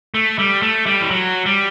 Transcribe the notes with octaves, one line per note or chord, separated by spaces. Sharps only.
A3
G3
A3
G3
E3
F#3
G3